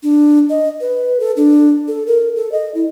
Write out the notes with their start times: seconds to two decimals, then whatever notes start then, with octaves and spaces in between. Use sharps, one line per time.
0.03 D4
0.50 D#5
0.81 B4
1.20 A4
1.37 D4
1.88 A4
2.07 A#4
2.36 A4
2.52 D#5
2.75 E4